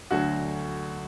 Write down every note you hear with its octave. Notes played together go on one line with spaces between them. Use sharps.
D2 D3 F#3 F#4